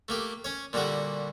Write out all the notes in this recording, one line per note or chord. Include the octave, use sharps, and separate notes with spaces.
A3 A#3 G4
C#4 C#5
A#2 D3 G3 F#4 G4